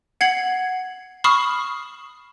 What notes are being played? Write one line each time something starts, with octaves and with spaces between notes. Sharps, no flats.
F#5 G#6 C7 F#7
B5 C#6 D#6 F6 C7 E7